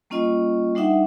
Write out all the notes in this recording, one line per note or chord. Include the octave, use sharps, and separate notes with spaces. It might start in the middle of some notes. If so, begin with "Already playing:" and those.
G3 A#3 C#4 F4 D#5
G3 D4 D#4 E5 F#5